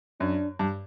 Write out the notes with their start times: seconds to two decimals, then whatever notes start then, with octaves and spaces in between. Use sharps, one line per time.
0.20 F#2 D4
0.59 G2